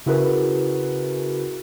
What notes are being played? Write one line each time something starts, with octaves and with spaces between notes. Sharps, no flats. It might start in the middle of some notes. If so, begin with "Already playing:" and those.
C#3 E4 F#4 G#4 A#4 B4